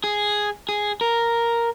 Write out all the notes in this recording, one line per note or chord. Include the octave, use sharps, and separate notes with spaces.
G#4
G#4
A#4